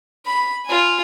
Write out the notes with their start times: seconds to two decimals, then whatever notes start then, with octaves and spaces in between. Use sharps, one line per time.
0.25 B5
0.66 F4 G#5